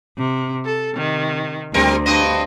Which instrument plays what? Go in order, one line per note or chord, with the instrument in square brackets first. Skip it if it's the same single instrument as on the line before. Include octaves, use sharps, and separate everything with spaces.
[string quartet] C3
A4
C3 D#3
[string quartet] D2 [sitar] G3 C4 A#4
[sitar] G2 C4 D#5